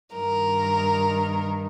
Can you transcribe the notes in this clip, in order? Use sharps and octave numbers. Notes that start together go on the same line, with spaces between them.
G2 D#3 A#4